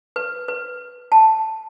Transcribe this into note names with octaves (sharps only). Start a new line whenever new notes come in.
B4
B4
A5